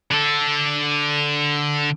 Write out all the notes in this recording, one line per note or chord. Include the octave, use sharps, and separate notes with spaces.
D3 A4